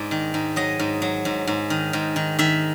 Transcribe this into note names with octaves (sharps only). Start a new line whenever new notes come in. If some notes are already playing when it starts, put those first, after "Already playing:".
Already playing: G#2 D5
D#3
G#2
F#3 D#5
G#2
F#3
G#2
G#2
D#3
G#2
D#3
D#3 E5